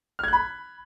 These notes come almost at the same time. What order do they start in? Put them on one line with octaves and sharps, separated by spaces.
F6 G#6 F#6 B5